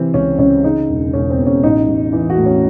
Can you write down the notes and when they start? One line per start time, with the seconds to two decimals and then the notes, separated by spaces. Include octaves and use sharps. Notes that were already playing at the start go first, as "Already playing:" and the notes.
Already playing: C3 E3 C4
0.14 C#2 C#4
0.38 C#2 C#4
0.64 C#3 D#4
0.89 E1
1.13 E1 C#4
1.30 C4
1.38 E2
1.47 C#4
1.63 A1 D#4
1.88 A1
2.13 E3
2.30 F#4
2.38 A2
2.46 C#4